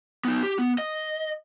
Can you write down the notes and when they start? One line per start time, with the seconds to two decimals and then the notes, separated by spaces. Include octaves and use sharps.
0.25 B3 D#4
0.43 G4
0.59 B3
0.78 D#5